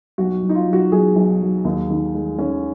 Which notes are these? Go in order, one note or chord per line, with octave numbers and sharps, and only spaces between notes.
B1 F#4
B1
D#4
F4
F#3
F#4
B1 G#4
B1
F#3
D#2
D#3
G#3
D#3 C#4